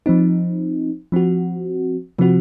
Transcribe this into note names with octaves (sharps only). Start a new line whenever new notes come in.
F3 C4 D#4
F3 C4 F#4
C3 F3 C4 F#4